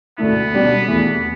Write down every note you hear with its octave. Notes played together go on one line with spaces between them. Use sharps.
D2 D3 A3 B3 E4
B2 G3 D4
E2 E3 A3